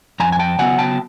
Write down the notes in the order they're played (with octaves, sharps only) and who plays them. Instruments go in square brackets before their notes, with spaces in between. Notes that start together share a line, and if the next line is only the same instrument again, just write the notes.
[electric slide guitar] F2 G#5 A#5
G#5
G5 A5
C#3 F#3 B3 F#5 G#5
G5 A5